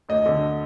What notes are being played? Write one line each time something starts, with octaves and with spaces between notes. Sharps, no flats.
D2 D#5
D3